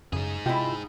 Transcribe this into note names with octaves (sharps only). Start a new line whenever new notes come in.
F#2 C#3 D#4 G#4
C3 E4 F4 D#5 G5